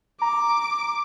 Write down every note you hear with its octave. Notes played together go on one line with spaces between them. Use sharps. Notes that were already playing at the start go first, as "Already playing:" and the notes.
A#5 D6